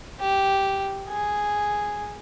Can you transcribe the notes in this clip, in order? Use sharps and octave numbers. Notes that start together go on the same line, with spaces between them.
G4
G#4